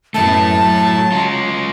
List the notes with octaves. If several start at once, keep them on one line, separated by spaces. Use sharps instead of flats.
F#2 A3 B3 E4 A5
F#3
G#3 F4